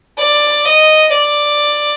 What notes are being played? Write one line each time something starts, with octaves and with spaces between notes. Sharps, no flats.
D5
D#5
D5